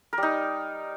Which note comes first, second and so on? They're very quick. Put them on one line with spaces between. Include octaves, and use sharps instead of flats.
A#4 G3 D#4